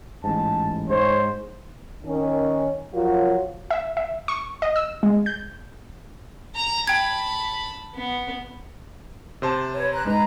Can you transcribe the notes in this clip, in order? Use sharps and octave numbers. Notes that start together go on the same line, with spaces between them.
A1 G#2 A5
G#2 C5 C#5
D#3 C#4
F3 F#3 F4 F#4 A#4 C#5
E5
E5
C#6
D#5
E6
G#3
G6
A#5
G5 A5 B5 G#6
B3
C3 C5 A5
B4 C#5
A#5 F#6
G#3 D#4 B4 A#5